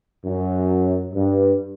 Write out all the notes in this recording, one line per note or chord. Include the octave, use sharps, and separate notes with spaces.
F#2
G2